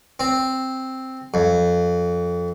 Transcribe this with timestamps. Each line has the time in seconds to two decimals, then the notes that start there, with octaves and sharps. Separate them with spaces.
0.20 C4
1.34 F2